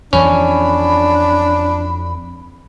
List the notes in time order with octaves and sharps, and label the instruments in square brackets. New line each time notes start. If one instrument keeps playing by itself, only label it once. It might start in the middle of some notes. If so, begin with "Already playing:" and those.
[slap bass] F2 E3 F3 [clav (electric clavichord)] C#4 [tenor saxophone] D4 [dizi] B5